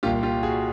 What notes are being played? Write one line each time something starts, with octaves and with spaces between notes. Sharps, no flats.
C2 A#2 F4 G4
F4 G4
F#4 G#4